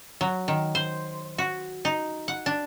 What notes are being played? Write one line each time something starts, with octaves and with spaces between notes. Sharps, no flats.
F#3
D#3
C5
F#4
D#4
F#5
D4